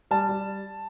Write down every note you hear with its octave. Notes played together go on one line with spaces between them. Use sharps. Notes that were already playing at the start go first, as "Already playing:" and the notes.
G3 A5
G3